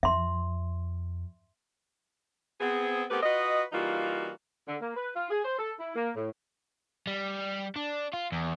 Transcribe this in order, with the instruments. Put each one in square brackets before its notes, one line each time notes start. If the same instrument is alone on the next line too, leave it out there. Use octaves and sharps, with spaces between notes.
[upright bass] F2 [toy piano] E5 C6
[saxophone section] B3 C4 G#4
A3 B3 C4 G4 A#4 B4
F4 F#4 B4 D#5
E3 G3 A#3 D#4 F4 F#4
D3
A#3
B4
F4
G#4
C5
A4
E4
A#3
A2
[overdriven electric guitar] G3
D4
F4
E2